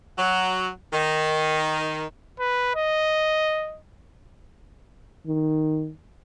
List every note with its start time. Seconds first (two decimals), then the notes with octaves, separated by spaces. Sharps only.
0.18 F#3
0.93 D#3
2.40 B4
2.76 D#5
5.27 D#3